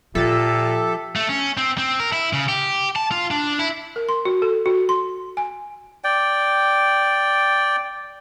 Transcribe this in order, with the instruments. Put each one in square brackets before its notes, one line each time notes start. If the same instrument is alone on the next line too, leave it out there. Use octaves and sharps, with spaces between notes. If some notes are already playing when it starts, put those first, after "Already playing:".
[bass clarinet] A#2 [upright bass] F3 [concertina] G4 E5 [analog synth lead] A4
[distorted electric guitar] A3
C#4
C4
C4
A#4
E4
C#3
G4
A5
F4
D4
E4
[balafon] A#4
C6
F#4
A4
F#4
C6
G#5
[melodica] D5 G5